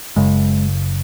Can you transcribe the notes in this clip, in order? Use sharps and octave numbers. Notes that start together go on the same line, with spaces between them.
F#1 F#2 C#3 G#3